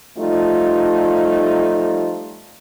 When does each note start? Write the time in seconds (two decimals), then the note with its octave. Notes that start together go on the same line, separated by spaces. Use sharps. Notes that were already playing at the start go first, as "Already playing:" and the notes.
0.18 F3 G3 A3 D#4 F4